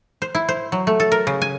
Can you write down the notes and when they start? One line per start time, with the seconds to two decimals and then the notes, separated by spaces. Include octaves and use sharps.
0.22 C5
0.35 E4
0.49 C5
0.72 F#3
0.87 A3
1.00 A4
1.12 A#4
1.27 C#3
1.42 G#5